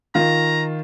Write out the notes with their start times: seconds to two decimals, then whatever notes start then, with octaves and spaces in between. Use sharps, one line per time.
0.15 D#3 F4 A#5